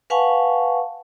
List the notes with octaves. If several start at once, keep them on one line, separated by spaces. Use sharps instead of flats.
B4 F5 F#5 G#5 A5 C#6